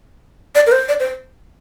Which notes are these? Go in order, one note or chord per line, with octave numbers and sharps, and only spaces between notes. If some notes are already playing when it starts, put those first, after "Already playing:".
D5
A#4
C5
D5
C5